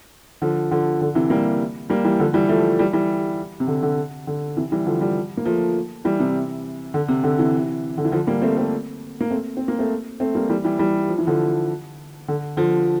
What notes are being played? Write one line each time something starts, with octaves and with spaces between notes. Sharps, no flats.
D3 F3
D3 F3
D3
C3 E3
G3 A#3
G3 A#3
E3 G3
D3 F3
E3 G3
F3 A3
E3 G3
E3 G3
C3
D3
D3
D3
C3 E3
E3 G3
D3 F3
E3 G3
A#3
F3 A3
E3 G3
C3 E3
D3
C3
D3
C3 E3
D3
E3
D3 F3
G3 A#3
A3 C4
A3 C4
A#3
A3 C4
C4
A#3
A3 C4
A3 C4
G3 A#3
E3 G3
E3 G3
E3 G3
F3
E3
D3 F3
D3
D3 F3